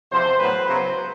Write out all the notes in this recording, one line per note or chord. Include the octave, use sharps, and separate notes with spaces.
E2 C3 F3 C5
A2 F#3 B3 B4
C#2 C#3 F#3 B3 C5